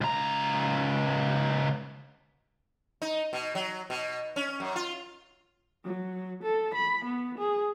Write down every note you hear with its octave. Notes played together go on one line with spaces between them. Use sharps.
C#2 A#5
D#4
B2
F#3
B2
C#4
F#2
F4
F#3
A4
B5
B3
G#4